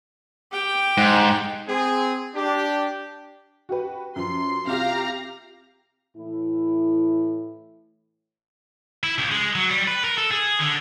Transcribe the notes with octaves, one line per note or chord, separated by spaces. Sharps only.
G4 G5
G#2
C4 G#4
D4 G4
F#4 G4 B4
F#2 F3 C6
C2 F4 G4 F5 A#5
A2 E3 E4
E4
C#2
G#3
F#3
G3
B4
A#4
A4
G#4
D3